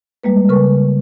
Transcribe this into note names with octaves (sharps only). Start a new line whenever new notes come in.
G3 G#3 A#3 B4
C#3 A#4 B4 C#6